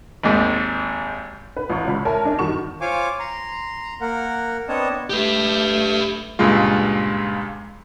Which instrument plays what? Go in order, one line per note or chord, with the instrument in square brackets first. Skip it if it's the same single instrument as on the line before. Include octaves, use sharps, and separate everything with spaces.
[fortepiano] G#1 D#2 G#2
[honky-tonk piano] B4
A1 C#6
C#2 B5
A#4 C#5 E5 G#5 A5
D4 D#4
E2 G2 D#3 F#4 C#6 E7
[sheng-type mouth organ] F4 C5 C#5 F5 G#5 D6
A#5 C6
A#3 A#4 F#5
B3 C4 D4 C#5 D#5 A5
[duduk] A3 [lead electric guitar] G4 B4
[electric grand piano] C#2 G2 A#2 G#3 F4